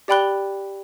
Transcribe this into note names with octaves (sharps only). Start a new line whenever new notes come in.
G4 D5 G5 B5 F#6 G7